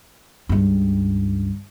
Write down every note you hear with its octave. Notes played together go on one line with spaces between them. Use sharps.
C#2 G2